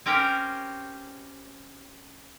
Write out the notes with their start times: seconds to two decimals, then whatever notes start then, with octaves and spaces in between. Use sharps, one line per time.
0.06 C4 C#4 G4 A#4 C5 G5